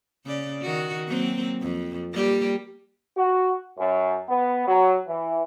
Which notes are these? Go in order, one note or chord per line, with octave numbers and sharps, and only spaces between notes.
C#3 C#4 D5
D#3 F#4
F#3 A#3 C4
F2
G3 A#3 G4
F#4
F#2
B3
F#3
E3